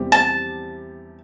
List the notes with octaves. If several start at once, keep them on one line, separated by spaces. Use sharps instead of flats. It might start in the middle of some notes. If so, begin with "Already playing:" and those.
Already playing: E2 C3 G3 C4 G4
A5